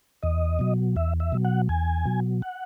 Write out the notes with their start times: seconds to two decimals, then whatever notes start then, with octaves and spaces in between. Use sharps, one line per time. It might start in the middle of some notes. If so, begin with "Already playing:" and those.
0.23 E2 D#5
0.59 B2 F#3
0.96 E2 E5
1.20 E5
1.32 B2 F#3
1.45 F#5
1.69 E2 G#5
2.06 B2 F#3
2.42 F#5